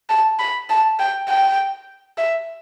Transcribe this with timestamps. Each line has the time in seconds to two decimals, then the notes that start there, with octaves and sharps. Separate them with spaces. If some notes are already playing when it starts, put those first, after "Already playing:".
0.10 A5
0.39 B5
0.70 A5
0.99 G5
1.29 G5
2.18 E5